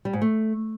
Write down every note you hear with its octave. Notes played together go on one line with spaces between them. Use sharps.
G3
G#2
A3